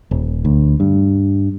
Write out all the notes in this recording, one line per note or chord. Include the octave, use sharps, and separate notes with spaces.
D#1
D2
G2